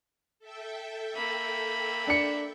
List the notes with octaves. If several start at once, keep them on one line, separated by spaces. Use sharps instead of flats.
A4 E5 G5
A#3 B5
D4 C#7